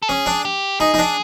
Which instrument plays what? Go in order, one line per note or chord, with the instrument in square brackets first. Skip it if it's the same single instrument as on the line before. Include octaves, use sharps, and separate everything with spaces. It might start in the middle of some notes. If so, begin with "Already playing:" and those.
[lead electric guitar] A4
[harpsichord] C#4 [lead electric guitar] G#4
[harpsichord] D4
[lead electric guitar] G4
[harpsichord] D#4 [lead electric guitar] G#4
[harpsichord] D#4
D4